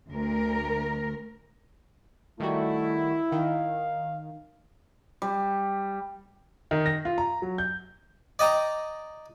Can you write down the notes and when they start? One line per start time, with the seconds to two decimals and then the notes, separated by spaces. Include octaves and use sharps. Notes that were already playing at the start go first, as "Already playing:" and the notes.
0.10 D2 A#4
2.40 D#3 G3 A3 E4 F#4
3.32 D#3 F5
5.22 G3
6.71 D#3
6.86 A#6
7.05 F4
7.18 A#5
7.42 F#3
7.58 G6
8.39 D5 D#5 G5 A#5